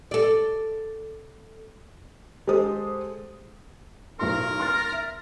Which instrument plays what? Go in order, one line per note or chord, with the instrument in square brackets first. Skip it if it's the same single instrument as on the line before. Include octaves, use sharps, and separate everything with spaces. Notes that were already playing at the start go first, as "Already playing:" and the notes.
[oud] A4 D5
[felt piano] G#3 G4 A4 C5 D#6
[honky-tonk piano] B1 A2 C6 [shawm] A#4
[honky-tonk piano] C6 F6 A6
E5